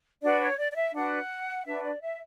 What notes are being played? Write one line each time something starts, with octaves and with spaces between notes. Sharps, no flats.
D4 F#4 B4 D5
C#5
D5
D5
E5
D4 F#4 B4 F#5
D4 F#4 B4 E5
D5
E5